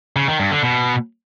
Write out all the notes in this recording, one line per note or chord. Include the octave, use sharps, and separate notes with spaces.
C#3
D#3
G2
D3
B2